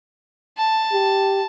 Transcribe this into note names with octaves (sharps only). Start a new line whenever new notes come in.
A5
G4